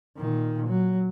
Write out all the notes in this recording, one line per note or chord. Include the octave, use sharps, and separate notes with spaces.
A#2 D#3
F#3